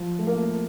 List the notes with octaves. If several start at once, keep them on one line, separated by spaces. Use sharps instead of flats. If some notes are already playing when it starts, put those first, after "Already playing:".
Already playing: F3
A3
A#3